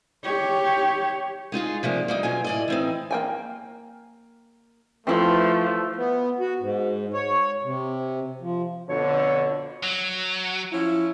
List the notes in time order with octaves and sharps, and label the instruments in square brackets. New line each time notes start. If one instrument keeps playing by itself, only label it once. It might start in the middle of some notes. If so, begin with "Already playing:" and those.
[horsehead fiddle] G4 C#5
[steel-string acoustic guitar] G#3 D#4 F4 G#4
C3 F3 G3 A#3
G3 A#3 D#4
B2 F#3 F4 G#5
A2 D5 D#5
E3 C4 D#4
[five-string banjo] A#3 G5 G#5
[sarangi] F3 [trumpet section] A3 [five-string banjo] C4 E4 B4
[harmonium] B3
F#4
G#2
C#5
C3
F3
[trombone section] F2 B2 D3 [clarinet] C#5
[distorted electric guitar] F#3
[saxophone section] F3 C#4 E4